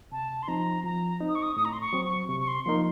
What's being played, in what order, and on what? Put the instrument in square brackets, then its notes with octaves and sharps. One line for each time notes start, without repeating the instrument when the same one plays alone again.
[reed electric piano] C3 [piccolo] A5
[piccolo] C6
[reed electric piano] F3 C4 D#4 [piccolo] A#5
[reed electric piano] F3 [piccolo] A#5
[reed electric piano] C4 D#4
[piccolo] D#6
C#6
D#6
[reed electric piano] A2 [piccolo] D#6
[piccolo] A#5
C6
C#6
[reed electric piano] F#3 C4
[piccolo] C#6
[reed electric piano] C3 [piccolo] C#6
[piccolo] C#6
C6
[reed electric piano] F3 A#3 D#4 A#4 [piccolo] C6